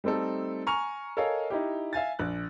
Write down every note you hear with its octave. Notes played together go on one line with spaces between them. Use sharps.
G3 A3 C4 D#4 A4
G#5 A#5 C#6 F6 F7
A4 A#4 C#5 D#5 F5 G#5
D#4 E4 G4
E5 F5 G#5 A6
A#1 F#6